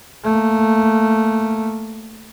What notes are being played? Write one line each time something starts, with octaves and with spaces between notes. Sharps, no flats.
A3 A#3